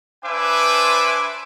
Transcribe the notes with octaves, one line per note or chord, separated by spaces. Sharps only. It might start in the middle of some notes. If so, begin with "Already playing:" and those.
D4 B4 C5 E5 G#5 D6